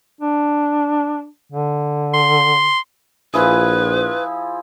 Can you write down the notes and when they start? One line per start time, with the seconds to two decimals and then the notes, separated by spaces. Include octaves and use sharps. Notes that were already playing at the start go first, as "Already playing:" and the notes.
0.21 D4
1.52 D3
2.14 C6
3.34 A#1 F3 E4 G#4 B4